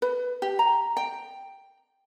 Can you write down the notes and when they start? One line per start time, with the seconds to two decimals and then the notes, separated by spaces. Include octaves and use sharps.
0.02 B4
0.42 G4
0.59 A#5
0.97 G5